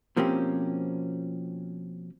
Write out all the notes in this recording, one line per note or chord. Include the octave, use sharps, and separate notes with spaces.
B2 F3 A#3 C4 C#4 G4